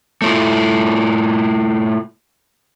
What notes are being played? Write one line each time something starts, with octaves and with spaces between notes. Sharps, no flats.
A3 E4 F4